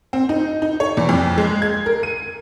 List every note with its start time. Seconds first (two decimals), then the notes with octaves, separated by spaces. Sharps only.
0.13 C4
0.29 D#4
0.62 D#4
0.80 C#5
0.97 E2
1.09 F2
1.38 G#3
1.62 G#6
1.86 A#4
2.03 D#7